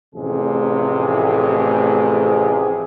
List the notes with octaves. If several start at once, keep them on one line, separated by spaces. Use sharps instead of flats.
A1 F2 A2 C3 G#4